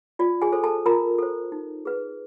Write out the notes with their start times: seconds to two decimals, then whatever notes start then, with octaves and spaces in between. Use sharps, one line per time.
0.19 F4 D5
0.42 G#4 G#5
0.52 A4 C5
0.64 A4 A5
0.86 F4 A#4 A#5
1.18 A4 C5
1.52 D#4
1.85 G#4 B4